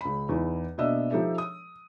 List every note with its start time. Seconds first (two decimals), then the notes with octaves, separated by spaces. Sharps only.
0.01 C#2 B5
0.29 E2 D#4 E4
0.78 B2 A#3 D4 D#5 E5 E6
1.11 F3 D#4 G4 A4 E5
1.38 D#6